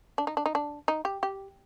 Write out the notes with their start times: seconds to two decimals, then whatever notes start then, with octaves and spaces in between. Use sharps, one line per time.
0.18 D4
0.27 D#4
0.37 D4
0.46 D#4
0.55 D4
0.88 D#4
1.05 G4
1.23 G4